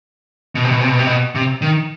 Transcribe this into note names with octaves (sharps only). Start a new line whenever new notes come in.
B2
C3
B2
C3
B2
C3
B2
C3
D#3